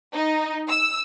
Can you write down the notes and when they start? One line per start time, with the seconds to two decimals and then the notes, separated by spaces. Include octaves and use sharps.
0.14 D#4
0.69 E6